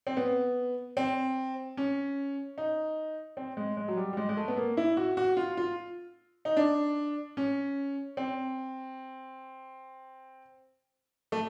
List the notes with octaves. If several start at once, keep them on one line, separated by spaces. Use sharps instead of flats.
C4
B3
C4
C#4
D#4
C4
G#3
G#3
F#3
G3
G3
G#3
G#3
A3
B3
A#3
E4
F#4
F#4
F4
F4
D#4
D4
C#4
C4
A3